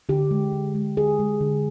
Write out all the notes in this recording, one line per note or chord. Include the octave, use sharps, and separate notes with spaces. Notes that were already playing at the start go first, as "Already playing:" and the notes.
D3 G4
G#3
D3
G#3
D3 G#4
G#3
D3